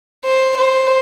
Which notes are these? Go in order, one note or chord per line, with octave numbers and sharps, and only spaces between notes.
C5
C5